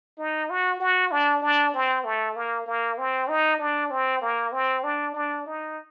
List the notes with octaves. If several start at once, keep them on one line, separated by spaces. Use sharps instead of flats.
D#4
F#4
F#4
D4
D4
C4
A3
A#3
A#3
C4
D#4
D4
C4
A#3
C4
D4
D4
D#4